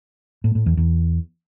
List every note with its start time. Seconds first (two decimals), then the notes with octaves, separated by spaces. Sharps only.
0.44 A2
0.55 A2
0.66 E2
0.77 E2